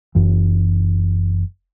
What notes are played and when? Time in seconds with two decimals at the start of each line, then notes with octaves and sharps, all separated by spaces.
0.15 F#1 F#2 E3